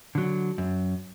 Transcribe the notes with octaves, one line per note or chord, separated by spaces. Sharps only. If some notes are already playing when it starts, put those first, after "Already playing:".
D3 F#3
F#2